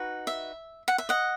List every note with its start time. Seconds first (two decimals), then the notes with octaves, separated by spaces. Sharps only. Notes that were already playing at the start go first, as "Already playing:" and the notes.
Already playing: D#4 F#4 B4
0.27 E5
0.88 F#5
0.98 E5
1.09 D#5 F#5